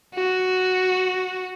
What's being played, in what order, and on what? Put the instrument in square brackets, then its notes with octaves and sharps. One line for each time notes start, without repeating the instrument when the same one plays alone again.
[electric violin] F#4